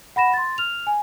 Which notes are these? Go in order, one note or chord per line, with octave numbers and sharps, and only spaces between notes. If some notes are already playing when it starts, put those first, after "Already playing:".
F#5 B5 A#6 E7
C6 A6
F6 F7
G#5